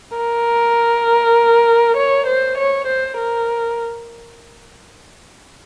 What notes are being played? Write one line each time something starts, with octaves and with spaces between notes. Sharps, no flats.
A#4
C#5
C5
C#5
C5
A#4